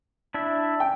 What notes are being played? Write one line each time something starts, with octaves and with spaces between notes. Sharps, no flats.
D4 E4 E5
G5